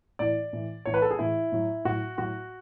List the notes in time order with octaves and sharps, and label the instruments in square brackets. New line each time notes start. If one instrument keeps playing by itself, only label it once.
[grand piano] A2 E3 D5
A2 E3
A2 E3 C#5
B4
A4
G#4
A2 E3 E4
A2 F#3
A2 F#3 F#4
A2 F#3 F#4